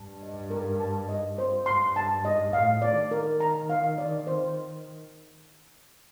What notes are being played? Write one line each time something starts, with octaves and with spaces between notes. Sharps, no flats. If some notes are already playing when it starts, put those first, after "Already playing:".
Already playing: G2 A5
D#5
A#4
A5
D#5
C5
G2 C6
A5
D#5
A2 F5
D5
D#3
A#4
A#5
F5
D5
C5